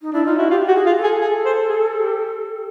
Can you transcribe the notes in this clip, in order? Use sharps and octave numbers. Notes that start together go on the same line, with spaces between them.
D#4
D4 E4
D#4 F4
E4 F#4
F4 G4
F#4 G4
G#4
F4
A4
G#4
G#4
C5
G#4
G4